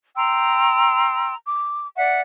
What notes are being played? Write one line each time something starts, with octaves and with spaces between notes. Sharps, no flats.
G5 A#5 C6 E6
D6
D5 E5 F#5